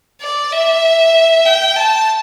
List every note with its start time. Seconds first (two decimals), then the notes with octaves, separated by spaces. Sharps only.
0.21 D5
0.52 E5
1.45 G5
1.76 A5